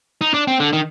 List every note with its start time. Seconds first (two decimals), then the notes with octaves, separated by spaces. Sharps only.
0.21 D#4
0.34 D4
0.48 C4
0.60 D3
0.73 D#3